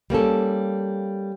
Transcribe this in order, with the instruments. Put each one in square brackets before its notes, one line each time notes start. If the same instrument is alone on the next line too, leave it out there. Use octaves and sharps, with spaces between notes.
[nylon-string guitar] G3 A#3 C#4 A4